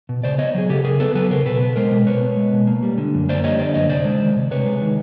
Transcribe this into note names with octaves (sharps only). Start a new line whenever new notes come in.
B2
C#3 C5 D5
B3 C#5 D#5
F#3 G#4
C#3 G4 A4
C#3 G#4 A#4
B3 A4 B4
F#3 A4 B4
C#3 A#4 C5
B2 A4 B4
B3
G#3 A#4 C5
B2
B2 B4 C#5
B3
G#3
B2
A#3
G3
D3
F#2
A#3 C5 D5
G3 C#5 D#5
D3 C5 D5
F#2 C#5 D#5
C3 C5 D5
G#3
D#3
C3
C3 B4 C#5
G#3
D#3